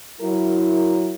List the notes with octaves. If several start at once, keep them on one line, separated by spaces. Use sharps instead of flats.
F#3 E4 A#4